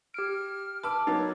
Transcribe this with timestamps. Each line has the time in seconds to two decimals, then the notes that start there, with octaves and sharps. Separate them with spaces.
0.14 G4 F6 D7
0.83 B4 A5 D6 E6 D7
1.07 F#3 A#3 B3 D#4 C#5